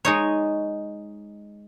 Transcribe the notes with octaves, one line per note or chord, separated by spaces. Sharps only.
G#3 D#4 C#5